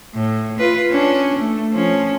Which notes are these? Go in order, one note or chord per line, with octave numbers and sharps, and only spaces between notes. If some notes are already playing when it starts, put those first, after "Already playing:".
A2
F4 B4
C#4 D4
A3
F3 C#4